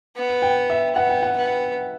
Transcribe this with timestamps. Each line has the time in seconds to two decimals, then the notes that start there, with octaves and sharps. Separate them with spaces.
0.16 B3
0.42 G5
0.70 E5
0.95 B3 F#5
1.09 G5
1.23 F#5
1.37 B3